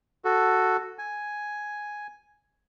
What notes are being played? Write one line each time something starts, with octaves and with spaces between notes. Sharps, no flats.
F#4 A4
G#5